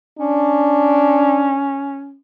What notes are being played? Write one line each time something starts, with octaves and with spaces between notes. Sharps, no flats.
C#4 D4